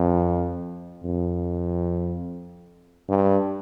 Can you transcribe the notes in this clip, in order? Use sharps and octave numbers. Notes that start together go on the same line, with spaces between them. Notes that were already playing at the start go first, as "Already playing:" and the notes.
Already playing: F2
F2
G2